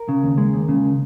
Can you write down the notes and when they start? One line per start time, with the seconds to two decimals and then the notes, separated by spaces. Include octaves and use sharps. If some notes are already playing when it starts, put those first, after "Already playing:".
Already playing: A#4
0.09 C#3
0.23 D#2
0.38 G#3
0.53 D#2
0.69 C#3